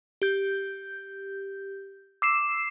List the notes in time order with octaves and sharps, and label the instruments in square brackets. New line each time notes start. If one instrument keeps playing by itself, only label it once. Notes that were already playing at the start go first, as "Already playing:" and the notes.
[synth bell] G4 G6
[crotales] D6 C7 E7 [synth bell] E6